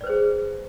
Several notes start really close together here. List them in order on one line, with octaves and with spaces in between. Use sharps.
D5 B4 C5 G#4